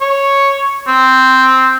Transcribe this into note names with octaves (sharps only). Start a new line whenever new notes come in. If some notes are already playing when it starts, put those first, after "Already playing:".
C#5
C4